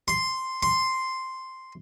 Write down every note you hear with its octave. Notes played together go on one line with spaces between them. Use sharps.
C6
C6